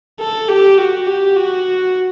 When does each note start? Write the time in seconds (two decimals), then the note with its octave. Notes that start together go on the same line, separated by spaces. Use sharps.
0.20 A4
0.49 G4
0.78 F#4
1.07 G4
1.36 F#4